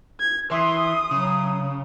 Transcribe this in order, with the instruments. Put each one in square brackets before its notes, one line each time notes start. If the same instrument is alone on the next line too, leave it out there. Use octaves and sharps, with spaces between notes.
[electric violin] G#6
[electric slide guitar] E3 [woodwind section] E5 C6 [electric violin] D#6
[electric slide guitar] C#3 [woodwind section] F#3